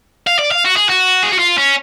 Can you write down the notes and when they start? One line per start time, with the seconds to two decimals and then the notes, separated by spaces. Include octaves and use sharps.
0.27 F5
0.39 D5
0.51 F5
0.64 F#4
0.76 G#4
0.89 F#4
1.23 G#4
1.32 F#4
1.39 F4
1.58 C#4